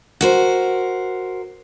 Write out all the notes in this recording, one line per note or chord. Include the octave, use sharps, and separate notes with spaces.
F#4 A#4 C5